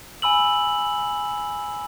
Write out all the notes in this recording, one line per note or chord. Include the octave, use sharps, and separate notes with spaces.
G#5 B5 E6 F#7